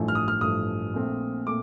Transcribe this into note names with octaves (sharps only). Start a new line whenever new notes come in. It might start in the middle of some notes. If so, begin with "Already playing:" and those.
Already playing: A1 G2 F3 A3
F6
D#6
F6
A1 G2 F3 A3 D#6
A#1 A#2 A3 C4
A#2 A3 C4 D6